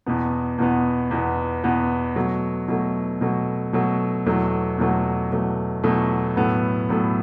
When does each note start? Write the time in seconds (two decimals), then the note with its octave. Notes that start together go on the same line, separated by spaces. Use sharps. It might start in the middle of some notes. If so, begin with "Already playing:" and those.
0.06 E2 B2 B3
0.58 E2 B2 B3
1.11 E2 B2 B3
1.64 E2 B2 B3
2.16 B2 F#3 A3
2.68 B2 F#3 A3
3.21 B2 F#3 A3
3.73 B2 F#3 A3
4.26 E2 B2 F#3 A3
4.78 E2 B2 F#3 A3
5.31 E2 B2 F#3 A3
5.84 E2 B2 F#3 A3
6.36 A2 F#3 B3 A4
6.89 A2 F#3 B3 A4